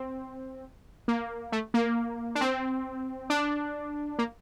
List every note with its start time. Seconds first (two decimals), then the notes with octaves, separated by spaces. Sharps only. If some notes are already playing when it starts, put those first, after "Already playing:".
Already playing: C4
1.08 A#3
1.52 A3
1.74 A#3
2.35 D4
2.41 C4
3.30 D4
4.19 A#3